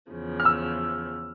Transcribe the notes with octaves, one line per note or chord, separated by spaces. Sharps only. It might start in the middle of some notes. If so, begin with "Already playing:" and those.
E2 C#3 F3
F6
E6